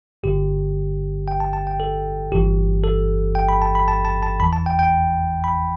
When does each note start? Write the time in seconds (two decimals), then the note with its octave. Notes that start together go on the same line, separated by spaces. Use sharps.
0.23 G1 G2 D3 G4
1.28 G5
1.40 A5
1.53 A5
1.67 G5
1.80 A4
2.31 G1 G2 E3 G4
2.84 A4
3.35 G5
3.49 B5
3.62 A5
3.75 B5
3.88 A5
4.05 A5
4.23 A5
4.40 E2 E3 B5
4.53 A5
4.66 G5
4.79 G5
5.44 B5